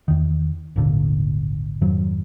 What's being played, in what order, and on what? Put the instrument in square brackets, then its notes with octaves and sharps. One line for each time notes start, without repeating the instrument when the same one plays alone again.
[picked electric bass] E2 D#3
G#1 D#2 A#2 D3
F2 G#2 D#3 F#3